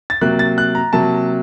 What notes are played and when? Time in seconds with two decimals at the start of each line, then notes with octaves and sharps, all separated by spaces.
0.10 A6
0.21 C3 F#3 A#3 F#6
0.39 A6
0.58 F#6
0.75 A#5
0.93 C3 F#3 A#3 A5